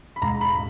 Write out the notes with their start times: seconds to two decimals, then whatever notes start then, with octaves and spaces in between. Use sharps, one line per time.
0.16 B5
0.22 G#2 A#5
0.41 B5